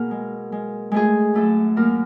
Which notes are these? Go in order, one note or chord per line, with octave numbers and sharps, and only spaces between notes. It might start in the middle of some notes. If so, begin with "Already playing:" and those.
Already playing: B2 A#3 G#4 A#4
G#3
G#3
G#3 A3 G#4
F#2 A3 A4
F#2 A#3 A#4